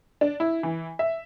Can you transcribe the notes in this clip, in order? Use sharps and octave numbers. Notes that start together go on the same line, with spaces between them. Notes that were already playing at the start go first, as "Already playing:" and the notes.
D4
E4
E3
E5